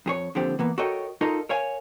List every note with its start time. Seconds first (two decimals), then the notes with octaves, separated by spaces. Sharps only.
0.06 F2 G#4 C#5
0.35 D#2 D3 F3 C4 G4
0.59 E3 A#3 B3
0.78 F#4 A4 A#4 C#5 D#5 G5
1.21 D#4 F4 A4 A#4 D#5
1.49 A#4 C#5 F5 G#5